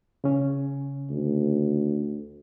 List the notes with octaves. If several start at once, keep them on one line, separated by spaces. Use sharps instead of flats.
C#3 C#4
D2